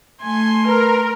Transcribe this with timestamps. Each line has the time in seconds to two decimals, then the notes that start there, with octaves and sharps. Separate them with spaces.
0.23 A3 G#5 C6
0.66 A#4 B4